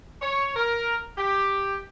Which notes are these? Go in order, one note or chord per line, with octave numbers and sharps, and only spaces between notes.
C#5
A#4
G4